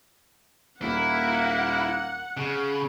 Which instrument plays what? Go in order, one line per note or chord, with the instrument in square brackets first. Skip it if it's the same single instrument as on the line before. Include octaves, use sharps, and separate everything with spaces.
[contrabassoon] D#1 [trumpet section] A#3 [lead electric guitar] E4 [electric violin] F#5
[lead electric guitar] C#3